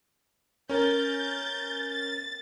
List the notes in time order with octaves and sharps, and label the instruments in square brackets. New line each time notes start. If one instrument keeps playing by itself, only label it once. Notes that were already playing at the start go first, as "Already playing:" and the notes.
[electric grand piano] C#4 A#4 [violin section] G6 A6
[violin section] A6